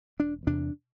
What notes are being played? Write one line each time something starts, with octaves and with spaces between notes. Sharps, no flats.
E1 D4
E2 C3 D4